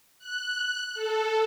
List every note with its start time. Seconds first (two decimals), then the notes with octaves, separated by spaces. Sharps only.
0.19 F#6
0.94 A4